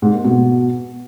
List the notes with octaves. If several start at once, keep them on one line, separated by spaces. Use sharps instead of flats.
G#2
A#3
B2